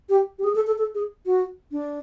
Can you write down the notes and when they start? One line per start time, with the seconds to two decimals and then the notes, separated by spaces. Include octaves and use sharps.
0.09 G4
0.39 G4
0.44 G#4
0.55 A4
0.67 A4
0.78 A4
0.95 G#4
1.26 F#4
1.72 D4